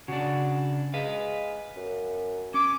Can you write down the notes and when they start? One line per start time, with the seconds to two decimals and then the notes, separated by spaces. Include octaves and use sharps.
0.08 C#3 D4 F#4
0.94 G#3 B4 F5
1.76 F#2
2.54 C#4 D6